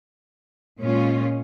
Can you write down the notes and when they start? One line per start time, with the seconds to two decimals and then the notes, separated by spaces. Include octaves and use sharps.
0.81 A#2 G#3 C#4 F4